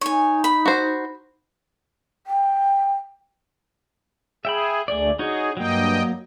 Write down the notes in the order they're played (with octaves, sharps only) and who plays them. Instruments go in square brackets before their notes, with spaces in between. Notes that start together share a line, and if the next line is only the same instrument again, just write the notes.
[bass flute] D#4 [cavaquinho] C#5 G#5
[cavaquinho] B5
[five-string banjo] F#4 C5
[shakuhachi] G5
[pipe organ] G#4 [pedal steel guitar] E5 G5 B5
[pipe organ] D2 A3 [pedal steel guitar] G#4 D5
[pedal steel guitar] D#4 F#4 C#5 [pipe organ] G#4
[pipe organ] G2 D#5 G5 [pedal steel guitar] F#3 A#3